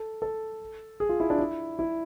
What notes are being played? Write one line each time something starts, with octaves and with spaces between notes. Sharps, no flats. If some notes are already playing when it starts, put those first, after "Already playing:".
Already playing: A4
A4
G#4
F4
E4
D4
E4
E4